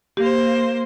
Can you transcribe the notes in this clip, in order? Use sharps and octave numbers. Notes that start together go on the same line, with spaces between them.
A#3 G4 C5